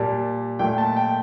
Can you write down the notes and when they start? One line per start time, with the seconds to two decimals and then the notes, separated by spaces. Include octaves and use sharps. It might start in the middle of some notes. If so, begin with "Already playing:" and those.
Already playing: A#2 G3 A5
0.59 A#2 A3 G5
0.78 A5
0.97 G5